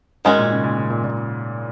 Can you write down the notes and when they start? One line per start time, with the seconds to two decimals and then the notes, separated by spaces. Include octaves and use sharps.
0.25 G#2 D#3 G#3 C#4 F#4
0.38 A#2
0.51 C#3
0.64 A#2
0.77 C#3
0.90 A#2
1.04 A#2